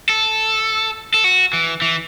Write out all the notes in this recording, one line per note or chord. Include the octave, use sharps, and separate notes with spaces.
A4
A4
F#4
E3
E3